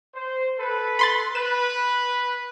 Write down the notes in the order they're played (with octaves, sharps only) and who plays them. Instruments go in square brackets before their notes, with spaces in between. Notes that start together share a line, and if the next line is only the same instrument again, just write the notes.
[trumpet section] C5
A4 B4
[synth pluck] B5 C6 A6
[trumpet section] B4 [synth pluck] E7